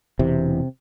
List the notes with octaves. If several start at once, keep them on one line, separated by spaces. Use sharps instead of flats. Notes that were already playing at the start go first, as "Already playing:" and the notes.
E1 C3 E3